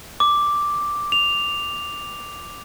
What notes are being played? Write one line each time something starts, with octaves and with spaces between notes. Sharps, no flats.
D6
F7